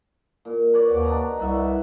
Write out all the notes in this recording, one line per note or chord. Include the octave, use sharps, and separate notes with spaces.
A#2
B4 C#5 D5
D#2 F#4 D6
D4 D#4 A#5
C2 F#4 B4 E5